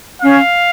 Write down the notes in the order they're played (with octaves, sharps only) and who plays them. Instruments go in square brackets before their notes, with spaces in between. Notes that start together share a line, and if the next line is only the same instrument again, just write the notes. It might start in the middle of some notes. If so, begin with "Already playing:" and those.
[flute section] C#4 [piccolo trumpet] F5